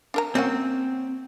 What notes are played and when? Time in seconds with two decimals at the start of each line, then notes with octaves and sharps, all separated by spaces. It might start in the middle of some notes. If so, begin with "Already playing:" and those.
0.14 D4 A#4 A#5
0.35 A#3 C4 C#4 F#4